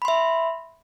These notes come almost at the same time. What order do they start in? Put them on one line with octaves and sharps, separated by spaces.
B5 C6 E5